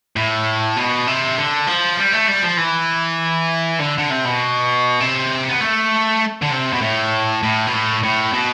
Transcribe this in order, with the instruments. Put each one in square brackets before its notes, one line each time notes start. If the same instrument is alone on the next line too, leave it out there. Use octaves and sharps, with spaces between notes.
[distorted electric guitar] A2
B2
C3
D3
F3
G3
A3
G3
F3
E3
D3
D3
C3
B2
C3
B3
A3
D3
C3
B2
A2
A2
B2
A2
A2
B2